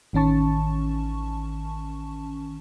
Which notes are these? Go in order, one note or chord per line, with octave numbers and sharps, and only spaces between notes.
A1 D#3 C#4 A5 C#6